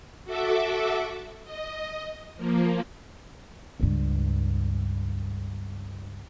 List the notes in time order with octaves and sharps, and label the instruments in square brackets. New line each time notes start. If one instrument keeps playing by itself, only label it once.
[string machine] F#4 A4 E5 D6
D#5
F3 A#3
[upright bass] C#2 G2